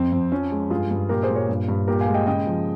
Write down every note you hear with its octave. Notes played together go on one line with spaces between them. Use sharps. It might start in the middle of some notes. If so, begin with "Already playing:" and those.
Already playing: F2 C4
F2
F3 C#4
G#3
G2 F4 G#4
G2
A#2 G4 A#4
G#4 C5
A#2
A#4 C#5
G2
G2
A#2 G4 A#4
F5 G#5
G#3
D#5 G5
C#3 D#5 G5
F3